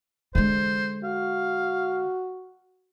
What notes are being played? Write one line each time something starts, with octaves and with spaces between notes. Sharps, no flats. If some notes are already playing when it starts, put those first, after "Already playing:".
D3 G#3 C5
F#4 F5